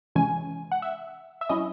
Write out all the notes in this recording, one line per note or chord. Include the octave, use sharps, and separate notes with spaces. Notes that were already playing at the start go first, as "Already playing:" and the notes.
C3 E3 G#3 C#4 G#5
F#5
E5
E5
F#3 C#4 E4 D#5